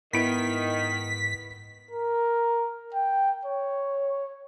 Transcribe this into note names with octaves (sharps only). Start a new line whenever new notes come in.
G#2 D#3 B3 E4 B6 D7
A#4
G5
C#5